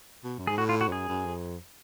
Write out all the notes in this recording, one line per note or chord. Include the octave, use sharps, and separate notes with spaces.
B2
F#2
G#2 G#4
A2 F#4
F4
F#4
F2
F#2 G#4
F#2
F2